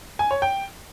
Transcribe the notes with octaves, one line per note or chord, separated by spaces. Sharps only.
G#5
C#5
G5